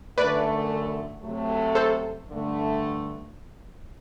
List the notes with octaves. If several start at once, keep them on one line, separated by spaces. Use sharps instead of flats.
F#2 D3 A3 B4 D5
C3 F#3 A3
A4 C5
G2 D3 A3